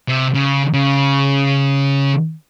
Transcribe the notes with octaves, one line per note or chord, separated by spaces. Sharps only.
C3
C#3
C#3